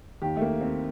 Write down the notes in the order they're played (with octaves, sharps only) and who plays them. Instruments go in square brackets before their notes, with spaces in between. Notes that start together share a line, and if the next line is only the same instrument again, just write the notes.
[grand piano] D#2 D#3 G4
A3
A#3
C4